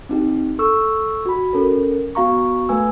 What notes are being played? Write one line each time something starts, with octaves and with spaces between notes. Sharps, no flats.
C4 D#4 G4
A4 C#6 E6
F#4 B5
C#4 A4 A#4
B3 F#4 F5 A#5 C#6
A3 B4 G#5 E6